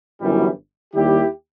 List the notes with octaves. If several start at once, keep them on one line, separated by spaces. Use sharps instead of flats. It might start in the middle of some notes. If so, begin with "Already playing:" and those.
G1 F#2 E3 G3
D#2 D#3 G3 E4 G4